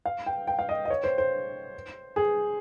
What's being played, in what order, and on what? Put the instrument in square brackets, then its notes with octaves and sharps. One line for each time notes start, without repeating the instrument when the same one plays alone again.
[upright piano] F5
G5
G5
F5
D#5
D#5
C#5
C5
C5
G#4